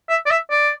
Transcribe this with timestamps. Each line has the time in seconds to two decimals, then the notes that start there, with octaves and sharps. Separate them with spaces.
0.09 E5
0.26 D5
0.30 E5
0.50 D5